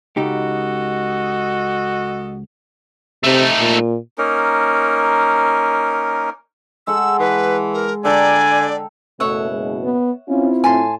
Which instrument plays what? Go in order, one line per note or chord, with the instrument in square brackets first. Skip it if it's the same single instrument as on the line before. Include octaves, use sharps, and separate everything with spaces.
[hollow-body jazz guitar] C#2 D#4 G4 [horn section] F#4 A4 D#5
[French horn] C3 [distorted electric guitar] A3 D#4
[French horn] A#2
[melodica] A#3 C#4 D#4 A#4
[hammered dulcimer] G#3 A4 F#5 [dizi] E6
[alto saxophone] E3 [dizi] B4
[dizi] A#4
[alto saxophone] D3 [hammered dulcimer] A4 G5 A#5 [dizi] D5 [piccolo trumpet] G#5
[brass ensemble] F#1 B2 [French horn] A3 [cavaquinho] C#5 E5 F#5
[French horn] G#3
B3
[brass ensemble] C4 E4 F4 [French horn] C#4
[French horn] A2 [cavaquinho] G#5 A5 C6